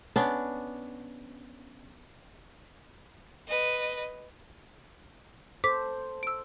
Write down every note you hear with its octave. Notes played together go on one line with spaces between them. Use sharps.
B3 C#4 D4
B4 D#5
A4 C5 D6 B6
E6 D7